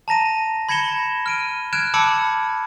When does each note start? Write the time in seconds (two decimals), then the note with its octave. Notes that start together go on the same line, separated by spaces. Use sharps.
0.08 A5 A#5 A#6 D#7
0.69 B5 G#6 A#6 C#7 E7 G7
1.26 F6 D7 D#7
1.73 F6 F#6 G#6 D7 E7
1.94 A5 B5 D6 E6 C#7 D7